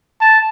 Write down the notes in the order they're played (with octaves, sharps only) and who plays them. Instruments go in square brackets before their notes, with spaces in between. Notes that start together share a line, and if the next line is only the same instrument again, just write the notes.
[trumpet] A5